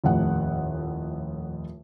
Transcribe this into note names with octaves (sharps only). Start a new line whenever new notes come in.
D#1 F2 A2 F#5